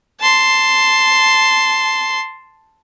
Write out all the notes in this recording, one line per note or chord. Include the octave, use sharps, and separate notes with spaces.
A5 C6